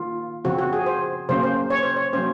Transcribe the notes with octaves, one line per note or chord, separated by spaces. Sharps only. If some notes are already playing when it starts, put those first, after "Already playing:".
Already playing: D#3 A#3 F4
C#3 F3 C4 F#4
F#4
G#4
C5
C#3 F#3 A#3 C#4 C5
C5
C#5
C5
C#5
F#3 A#3 C#4 C5